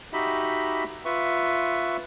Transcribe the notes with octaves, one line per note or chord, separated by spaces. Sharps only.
D#4 F#4 G4 D#5 E5 B5
F4 B4 E5 C#6